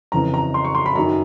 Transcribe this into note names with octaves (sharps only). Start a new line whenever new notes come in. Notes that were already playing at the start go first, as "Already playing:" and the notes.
F2 C#3 E3 A#5
A#5
C6
C#6
C6
B5
F#2 D#3 A#5